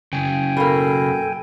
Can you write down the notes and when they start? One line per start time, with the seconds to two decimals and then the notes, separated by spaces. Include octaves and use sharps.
0.13 F#2 C#3 G5 G#5
0.57 B2 A#3 A4